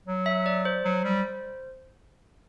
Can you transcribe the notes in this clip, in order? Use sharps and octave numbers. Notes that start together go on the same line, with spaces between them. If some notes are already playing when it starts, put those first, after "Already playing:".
F#3
E5
D5
C5
F#3
G3